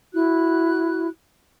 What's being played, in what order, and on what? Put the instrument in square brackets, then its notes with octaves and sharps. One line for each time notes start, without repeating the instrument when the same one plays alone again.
[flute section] E4 F#4 F#6